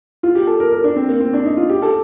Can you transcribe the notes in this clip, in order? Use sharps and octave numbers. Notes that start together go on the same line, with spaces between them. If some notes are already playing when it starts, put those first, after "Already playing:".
F4
G4
A4
A#4
A#4
D4
C4
A#3
C4
D4
D#4
F4
G4
A4